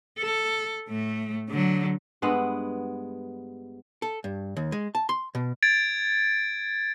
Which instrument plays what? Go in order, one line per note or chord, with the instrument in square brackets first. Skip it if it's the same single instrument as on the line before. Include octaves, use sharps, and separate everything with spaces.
[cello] A4
A2 A3
D3 F#3
[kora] G2 G#3 B3 F#5
[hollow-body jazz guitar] A4
G2
D#2
G#3
A5
C6
B2
[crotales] G#6 A6 D7